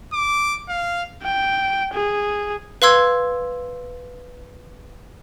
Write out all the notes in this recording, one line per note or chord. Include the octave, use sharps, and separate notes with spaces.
D6
F5
G5
G#4
B4 F5 C6 E6 G#6